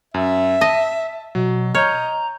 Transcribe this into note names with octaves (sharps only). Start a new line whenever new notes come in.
F#2 E5
D#5 A5
B2 F#3
C#5 D#5 A#5 F6 G6